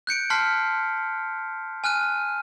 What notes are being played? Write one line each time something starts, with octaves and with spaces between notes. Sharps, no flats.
F#6 G6 C#7 D7
A5 C6 F6 F#6 B6 C7
G#5 F6 F#6 D#7